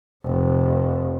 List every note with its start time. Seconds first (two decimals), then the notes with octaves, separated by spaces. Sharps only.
0.25 F1